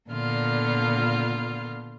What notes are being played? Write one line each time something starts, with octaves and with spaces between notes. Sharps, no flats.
A#2 D3 B3 F4 F6